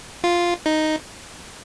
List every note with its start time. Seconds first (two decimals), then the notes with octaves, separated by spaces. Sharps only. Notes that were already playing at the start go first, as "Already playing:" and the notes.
0.24 F4
0.66 D#4